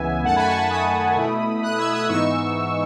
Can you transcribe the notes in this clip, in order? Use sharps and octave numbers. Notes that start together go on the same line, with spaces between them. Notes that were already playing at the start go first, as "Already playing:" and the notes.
Already playing: C#2 C#3 E3 B3 E5 G#5
F#2 D#3 A3 F#5 A5
G#5 B5
A5 C#6
F#5 A5
B5 D#6
B2 A3 E4
D#6 F#6
E6 G#6
D#6 F#6
G#2 E3 B3 D#4 C#6 E6